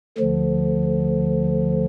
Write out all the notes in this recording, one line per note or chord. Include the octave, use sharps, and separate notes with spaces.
D2 D3 F3